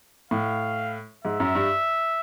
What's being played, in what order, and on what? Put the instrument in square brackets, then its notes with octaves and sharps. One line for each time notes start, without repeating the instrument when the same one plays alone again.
[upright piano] A2 [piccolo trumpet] F5
[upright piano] G#2 [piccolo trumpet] E5
[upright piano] F#2
G2